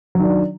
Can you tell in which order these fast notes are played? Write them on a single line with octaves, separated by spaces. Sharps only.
F#3 D#3 D4